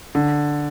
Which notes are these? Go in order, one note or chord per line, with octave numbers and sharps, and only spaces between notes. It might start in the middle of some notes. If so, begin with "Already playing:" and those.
D3